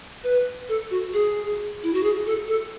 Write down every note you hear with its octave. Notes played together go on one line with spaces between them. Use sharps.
B4
A4
F#4
G#4
E4
F#4
G#4
A4
A4